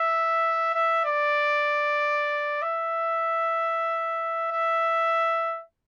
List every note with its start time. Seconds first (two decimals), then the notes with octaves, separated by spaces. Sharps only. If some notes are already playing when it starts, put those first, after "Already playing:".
Already playing: E5
0.74 E5
1.05 D5
2.62 E5
4.52 E5